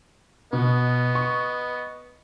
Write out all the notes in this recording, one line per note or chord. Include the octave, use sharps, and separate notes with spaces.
B2 B3 D#5
C#6